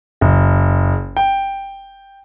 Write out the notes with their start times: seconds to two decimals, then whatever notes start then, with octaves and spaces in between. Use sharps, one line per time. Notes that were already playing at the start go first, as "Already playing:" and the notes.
0.21 F#1
1.17 G5